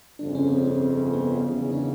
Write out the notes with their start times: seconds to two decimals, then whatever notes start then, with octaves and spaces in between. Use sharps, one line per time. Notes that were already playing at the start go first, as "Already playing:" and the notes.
0.19 G1 F2 C#3 D4
0.35 C#4
0.50 C4
0.59 C#4
0.67 C4
1.13 B3
1.44 F#1 E2 C#3
1.72 D4
1.75 D#4